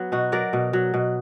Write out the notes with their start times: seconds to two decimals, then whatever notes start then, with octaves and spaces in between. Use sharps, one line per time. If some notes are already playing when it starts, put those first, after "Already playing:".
Already playing: F#3 B3
0.12 B2 D#4 F#4
0.32 F#3 A#4 D5
0.53 B2
0.73 F#3
0.94 B2